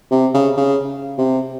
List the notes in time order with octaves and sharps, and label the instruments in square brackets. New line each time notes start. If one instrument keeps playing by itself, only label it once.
[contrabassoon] C3
C#3
C#3
C3